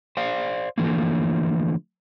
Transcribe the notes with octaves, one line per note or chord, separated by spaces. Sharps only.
C5 D5 F5
D3 E3 F3 A3 A#3